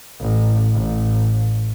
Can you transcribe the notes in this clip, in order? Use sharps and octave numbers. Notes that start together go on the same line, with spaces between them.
A1
A1